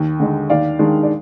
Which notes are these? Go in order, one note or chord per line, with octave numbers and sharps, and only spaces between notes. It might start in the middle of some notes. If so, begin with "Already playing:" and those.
Already playing: D#2
D3 G#3 D#4
D#2 D5 F5
D#3 G#3 D4
D5